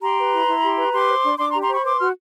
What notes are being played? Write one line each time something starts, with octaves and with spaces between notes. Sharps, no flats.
G4 A#5 C6
B4
E4
E4
G4
B4
G4 C6 D6
C5
D4
D4 C6 D6
A#5 C6
G4
A#5 C6
C5 B5 C#6
B4 C6 D6
F#4 F6